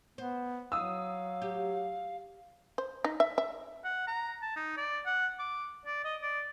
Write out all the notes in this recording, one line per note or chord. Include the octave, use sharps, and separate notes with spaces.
B3 C5
F#3 F5 D#6 E6
G4
C5
D#4
E5
E5
F#5
A#5
A5
D#4
D5
F#5
D6
D5
D#5
D5